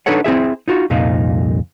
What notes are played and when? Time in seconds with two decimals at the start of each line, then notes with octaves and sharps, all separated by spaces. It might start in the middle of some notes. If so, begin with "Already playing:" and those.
0.06 D4 D#4 A4 B4 C#5 F#5
0.24 C4 E4 G#4 E5
0.68 D#4 F4 F#4
0.90 C2 F2 A#2 D#4 F5